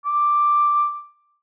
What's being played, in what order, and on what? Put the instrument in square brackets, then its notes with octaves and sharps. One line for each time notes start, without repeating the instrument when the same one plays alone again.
[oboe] D6